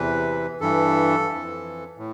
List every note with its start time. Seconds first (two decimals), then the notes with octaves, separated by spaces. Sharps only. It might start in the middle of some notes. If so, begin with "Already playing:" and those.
Already playing: E2 C3 E3 B4
0.60 G2 E3 A4
1.29 F2 E3
1.98 A2